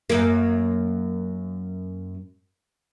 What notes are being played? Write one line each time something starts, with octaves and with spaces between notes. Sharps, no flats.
F#2 A#3